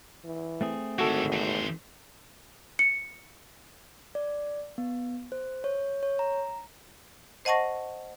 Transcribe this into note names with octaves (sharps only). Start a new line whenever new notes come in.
E3
A3 C4 G#4
G#1 D3 E4 F#4 A4
E2 C5
C#7
D5
B3
C5
C#5
C#5
A#5
C5 D#5 F#5 A5 C#6 A#6